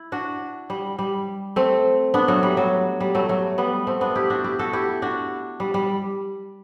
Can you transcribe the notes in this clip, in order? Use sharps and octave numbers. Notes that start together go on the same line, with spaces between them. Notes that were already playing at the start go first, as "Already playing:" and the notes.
Already playing: E4
D4 F#4
G3
G3
A3 C4
B3 D4
F#3 A3
G3
F#3
G3
F#3 A3
F#3 A3
G3 B3
A3 C4
B3 D4
E4 G4
D4 F#4
E4 G4
F#4 A4
E4 G4
D4 F#4
G3
G3